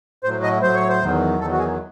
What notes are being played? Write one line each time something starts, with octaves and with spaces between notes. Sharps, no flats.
A2 F#3 C5
D#5
A2 F#3 C5
C#5
C5
E2 D#3 F#3
E2 D#3 F#3 A4
F#4
G#4